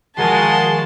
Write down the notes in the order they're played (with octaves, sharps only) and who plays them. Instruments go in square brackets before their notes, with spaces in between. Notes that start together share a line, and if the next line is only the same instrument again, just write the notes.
[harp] D#3 F3 [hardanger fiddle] G#3 C6 [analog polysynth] F#4 G#4 A#4 [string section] A5